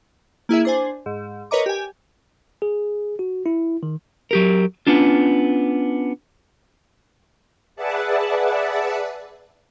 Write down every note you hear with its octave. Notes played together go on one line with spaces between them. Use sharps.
A#3 E4 G#4 E5
D4 C5 G#5
G#2
A#4 B4 C#5 D#5 A#5 D6
G4 G#5
G#4
F#4
E4
D#3
F#3 G4 A#4
B3 C#4 D4 F4
G#4 B4 D5 E5 F#5 A5